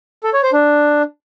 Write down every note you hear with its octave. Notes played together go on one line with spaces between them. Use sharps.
A4
C#5
C5
D4